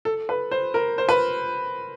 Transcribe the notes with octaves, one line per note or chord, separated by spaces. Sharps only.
A4
B4
C5
A#4
C5
B4